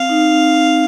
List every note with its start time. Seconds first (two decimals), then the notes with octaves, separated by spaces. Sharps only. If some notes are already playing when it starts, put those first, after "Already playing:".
Already playing: C4 F5
0.09 D#4
0.31 C4
0.54 C4